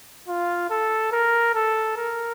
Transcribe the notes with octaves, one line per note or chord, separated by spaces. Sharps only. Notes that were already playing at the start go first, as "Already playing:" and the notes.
F4
A4
A#4
A4
A#4